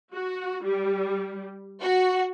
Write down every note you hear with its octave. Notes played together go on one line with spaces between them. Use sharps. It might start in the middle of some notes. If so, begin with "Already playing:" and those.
F#4
G3
F#4